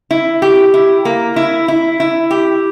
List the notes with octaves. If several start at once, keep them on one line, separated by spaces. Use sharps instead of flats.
E4
G4
E4
A#3
E4
E4
E4
G4